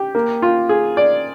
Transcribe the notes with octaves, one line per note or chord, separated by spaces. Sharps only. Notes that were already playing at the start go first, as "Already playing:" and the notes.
Already playing: G4
A#3
F4
G#4
D5